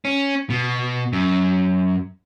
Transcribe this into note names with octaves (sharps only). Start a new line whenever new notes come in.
C#4
B2
F#2